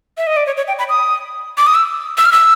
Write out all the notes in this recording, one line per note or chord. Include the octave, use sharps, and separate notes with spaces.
E5
D#5
D5
C#5
C#5
G5
B5
D#6
D6
D#6
E6
E6
F6
E6